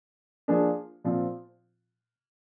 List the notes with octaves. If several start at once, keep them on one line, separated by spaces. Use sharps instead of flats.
F3 A#3 D4 F4 G#4
A#2 F3 C4 F4